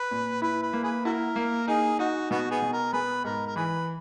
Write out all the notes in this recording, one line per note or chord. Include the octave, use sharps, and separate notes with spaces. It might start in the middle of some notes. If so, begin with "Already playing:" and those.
Already playing: B4
A#2
E4 B4
B4
A#3
G#4 B4
E4 F#4 A#4
A#3
D#4 G#4
D#4 F#4
B2 B3 F#4
B3 G#4
B2
A#4
B3 G#4 B4
G#2 A#4
A#4
E3 G#4 B4